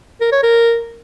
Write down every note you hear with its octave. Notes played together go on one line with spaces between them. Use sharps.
A#4
C#5
A#4